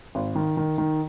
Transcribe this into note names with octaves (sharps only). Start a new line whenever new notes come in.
G#1
D#3
D#3
D#3